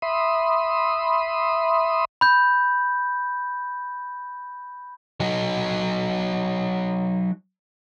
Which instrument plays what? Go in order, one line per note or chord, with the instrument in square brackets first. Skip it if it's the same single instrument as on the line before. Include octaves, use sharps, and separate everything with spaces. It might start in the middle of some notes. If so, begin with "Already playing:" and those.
[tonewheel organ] E5 B5 C6 D#6
[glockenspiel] B5 G6
[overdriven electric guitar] F#3 D#4